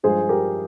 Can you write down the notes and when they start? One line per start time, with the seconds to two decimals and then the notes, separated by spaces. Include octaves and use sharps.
0.03 G2 F3 G#3 G#4 C5
0.29 G4 A#4